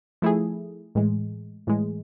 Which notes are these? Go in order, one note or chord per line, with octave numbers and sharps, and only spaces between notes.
F3 A3 E4 G#4
A2 E3 G#3
A2 E3 G#3